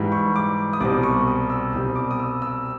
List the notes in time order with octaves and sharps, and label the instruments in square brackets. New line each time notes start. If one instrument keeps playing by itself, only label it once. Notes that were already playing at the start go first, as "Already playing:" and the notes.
Already playing: [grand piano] G#2 E3 G3
C#6
D6
D#6
C2 B2 G3 C4 D6
C#6
D#6
E6
C2 B2 G3 C4 D#6
D6
D#6
E6
E6